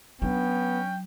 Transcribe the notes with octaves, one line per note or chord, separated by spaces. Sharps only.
F#3 B3 C#4 D4 G5